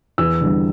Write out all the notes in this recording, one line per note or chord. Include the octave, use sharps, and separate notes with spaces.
E2 E6
D3 G3